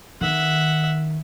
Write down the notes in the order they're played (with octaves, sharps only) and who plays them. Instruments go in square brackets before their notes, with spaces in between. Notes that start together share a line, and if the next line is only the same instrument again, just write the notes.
[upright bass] D#3 [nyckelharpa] E5 F#5